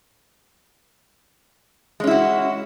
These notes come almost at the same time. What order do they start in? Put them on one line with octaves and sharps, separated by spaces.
G#3 C#4 E4 F#4